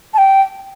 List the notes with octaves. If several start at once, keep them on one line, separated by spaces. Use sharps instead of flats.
A5
G5